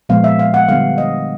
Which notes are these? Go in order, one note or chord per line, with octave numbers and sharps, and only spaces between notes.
A#2 F3 G#3 B3 F5
E5
F5
F#5
D3 G3 B3 F5
D#5